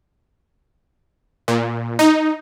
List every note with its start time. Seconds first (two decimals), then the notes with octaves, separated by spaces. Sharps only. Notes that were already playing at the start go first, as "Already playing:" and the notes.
1.48 A#2
1.99 D#4